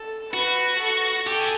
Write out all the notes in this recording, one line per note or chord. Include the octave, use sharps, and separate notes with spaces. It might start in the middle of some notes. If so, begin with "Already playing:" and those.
Already playing: A4
F#4 B4
A4
G4 A4
G#4